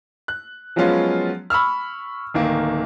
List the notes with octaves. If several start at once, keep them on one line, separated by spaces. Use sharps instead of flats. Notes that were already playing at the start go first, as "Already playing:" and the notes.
F#6
F3 F#3 G#3 B3 C#4 F4
B5 C#6 E6 F6
D1 D#3 A#3